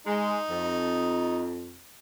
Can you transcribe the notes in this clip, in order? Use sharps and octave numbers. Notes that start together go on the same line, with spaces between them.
G#3 D#4
F2